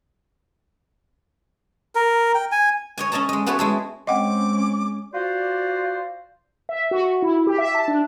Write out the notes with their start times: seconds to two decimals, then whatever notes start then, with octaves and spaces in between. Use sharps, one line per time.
1.95 A#4
2.35 G5
2.52 G#5
2.98 C#5 D#5 G#5
3.12 C#4 A4 D#5 A5 A#5
3.29 G#3 D#5
3.46 A3 B3 F#4 A4 B4 C#5
3.59 G#3 E4 A4
4.07 G#3 C4 C#4 D#5 F#5 G5 D6
5.14 F4 F#4 C5 D5
6.69 E5
6.91 F#4
7.22 E4
7.47 G4
7.58 E5
7.75 A5
7.88 D4